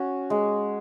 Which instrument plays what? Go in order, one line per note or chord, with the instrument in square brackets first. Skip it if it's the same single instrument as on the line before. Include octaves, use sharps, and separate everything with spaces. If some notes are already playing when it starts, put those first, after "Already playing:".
Already playing: [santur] C#4 F#4
G#3